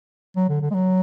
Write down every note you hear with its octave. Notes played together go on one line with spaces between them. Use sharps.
F#3
D3
D3
G#3
F#3